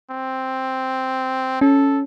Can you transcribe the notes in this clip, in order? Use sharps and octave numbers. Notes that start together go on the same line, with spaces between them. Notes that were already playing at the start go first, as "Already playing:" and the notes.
C4
C#4 A4